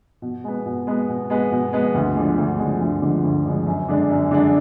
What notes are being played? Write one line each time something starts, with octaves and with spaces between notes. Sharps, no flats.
B2
G#3 B3
B2
G#3 B3
B2
G#3 B3
B2
G#3 B3
D2
D3 F3 G#3
D2
D3 F3 G#3
D2
D3 F3 G#3
D2
D3 F3 G#3
F#2
D3 G#3 D4
F#2
D3 G#3 D4